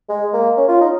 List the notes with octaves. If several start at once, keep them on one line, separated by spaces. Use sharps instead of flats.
G#3
A#3
C#4
F4
D#4